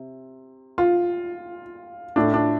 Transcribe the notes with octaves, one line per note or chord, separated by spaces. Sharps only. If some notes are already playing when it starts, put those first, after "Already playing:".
Already playing: C3
F4
A2 A3 D4
D4